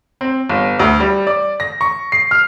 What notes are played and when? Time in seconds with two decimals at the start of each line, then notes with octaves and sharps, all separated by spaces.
0.21 C4
0.50 G1
0.79 D2
1.00 G3
1.27 D5
1.60 A#6
1.81 C#6
2.12 C7
2.31 F6